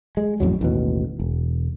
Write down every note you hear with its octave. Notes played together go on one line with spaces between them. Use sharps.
G#3
A1 F2 F#3
A1 D#2 B2
E1